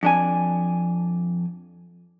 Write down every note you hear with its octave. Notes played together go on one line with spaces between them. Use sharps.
F2 D4 G#5